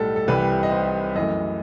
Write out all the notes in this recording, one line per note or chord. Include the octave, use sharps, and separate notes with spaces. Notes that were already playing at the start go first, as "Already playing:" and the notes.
Already playing: B1 A2 G3 A4
A4
C2 C3 E3 G3 B4
D#5
C5
F#2 E3 A3 D#5